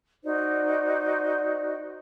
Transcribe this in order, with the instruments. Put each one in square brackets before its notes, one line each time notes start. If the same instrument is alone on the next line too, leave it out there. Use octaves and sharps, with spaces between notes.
[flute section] D#4 F#4 C5 D5